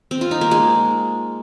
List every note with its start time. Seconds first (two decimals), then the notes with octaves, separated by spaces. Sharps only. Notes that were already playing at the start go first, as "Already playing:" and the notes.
0.11 C4
0.21 F4
0.31 D#4
0.41 A#3
0.51 G#3